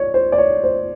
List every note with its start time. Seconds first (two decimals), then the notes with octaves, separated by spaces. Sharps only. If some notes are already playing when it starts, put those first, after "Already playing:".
Already playing: C#5 D5
0.14 C5
0.32 D5
0.38 C#5
0.64 C5